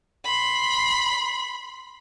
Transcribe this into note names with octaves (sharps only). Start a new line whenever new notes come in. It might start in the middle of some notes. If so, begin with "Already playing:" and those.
B5 C6